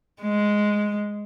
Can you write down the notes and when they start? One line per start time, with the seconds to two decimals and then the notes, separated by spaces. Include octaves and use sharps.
0.22 G#3